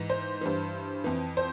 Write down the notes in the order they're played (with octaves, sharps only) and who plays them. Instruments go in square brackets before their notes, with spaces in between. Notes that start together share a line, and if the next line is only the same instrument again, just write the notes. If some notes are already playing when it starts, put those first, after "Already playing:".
Already playing: [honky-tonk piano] G#2 E3
C5
G2 E3
F2 E3
C5